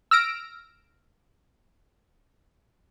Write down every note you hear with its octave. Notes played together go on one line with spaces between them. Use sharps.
E6 F6 A#6 D7